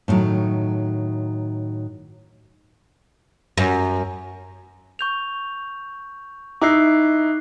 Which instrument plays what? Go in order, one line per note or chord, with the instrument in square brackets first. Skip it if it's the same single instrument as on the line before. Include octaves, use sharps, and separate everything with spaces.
[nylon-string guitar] A2 D3 D#3 F#3
[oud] F#2
[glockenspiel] C#6 G6 F7
[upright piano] D#4 E4 [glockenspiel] D6 F#6 C7